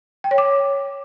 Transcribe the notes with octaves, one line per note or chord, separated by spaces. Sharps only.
G5
C#5
D6